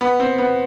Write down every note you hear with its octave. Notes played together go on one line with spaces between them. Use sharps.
B3
C4
B3